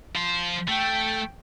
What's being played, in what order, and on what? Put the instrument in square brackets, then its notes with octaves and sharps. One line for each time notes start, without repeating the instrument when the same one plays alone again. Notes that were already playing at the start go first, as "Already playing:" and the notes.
[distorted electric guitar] F3 C5
[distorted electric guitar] A3 [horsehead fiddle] G5